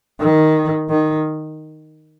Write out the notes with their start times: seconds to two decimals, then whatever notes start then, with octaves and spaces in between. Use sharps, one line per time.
0.20 D#3
0.90 D#3